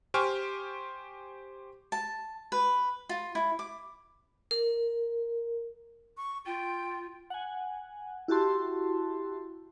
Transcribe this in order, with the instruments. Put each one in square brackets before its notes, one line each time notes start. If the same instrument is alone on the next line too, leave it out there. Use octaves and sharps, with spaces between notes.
[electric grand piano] G4 C5 G5 G#5 C#6 F6
[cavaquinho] A5
B4
F4
E4
D6
[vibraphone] A#4
[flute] C#6
[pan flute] F4 [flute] G5
[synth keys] F#5 G#5
E4 F#4 G4 A5 C6